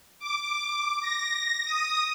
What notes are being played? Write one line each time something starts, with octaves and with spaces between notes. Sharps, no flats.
D6
A#6
D#6